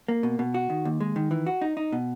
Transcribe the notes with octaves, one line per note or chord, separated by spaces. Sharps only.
A#3
B2
B2
F#4
D#3
D#2
G#3
D#3
E3
F#4
D#4
D#4
B2